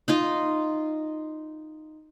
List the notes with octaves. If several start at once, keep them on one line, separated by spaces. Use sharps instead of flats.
D#4 F4 D#5